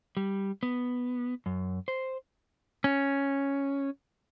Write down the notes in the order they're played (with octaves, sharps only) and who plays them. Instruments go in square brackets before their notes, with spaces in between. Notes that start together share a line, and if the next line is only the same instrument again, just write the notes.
[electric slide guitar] G3
B3
F#2
C5
[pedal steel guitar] C#4